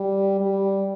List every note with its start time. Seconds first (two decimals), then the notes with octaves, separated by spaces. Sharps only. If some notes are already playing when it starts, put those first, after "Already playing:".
Already playing: G3
0.41 G3